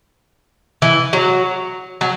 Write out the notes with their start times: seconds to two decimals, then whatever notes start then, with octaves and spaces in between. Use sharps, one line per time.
0.82 E3
1.13 F#3
2.01 F#3